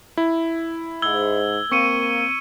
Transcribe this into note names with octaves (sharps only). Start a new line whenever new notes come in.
E4
G#2 E6 G#6 G7
A#3 C4 C#6 C#7 D#7